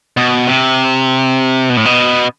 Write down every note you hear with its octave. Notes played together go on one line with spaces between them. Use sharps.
B2
C3
B2
A2
B2